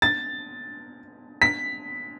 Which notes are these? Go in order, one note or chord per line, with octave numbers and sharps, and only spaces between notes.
A6
B6